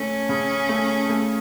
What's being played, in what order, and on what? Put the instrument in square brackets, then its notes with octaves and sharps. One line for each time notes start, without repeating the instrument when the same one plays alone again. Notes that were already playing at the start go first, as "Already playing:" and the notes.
Already playing: [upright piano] A3 [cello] C#4
[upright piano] C#3
A3
A3